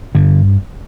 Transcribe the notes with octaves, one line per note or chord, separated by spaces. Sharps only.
G2 D3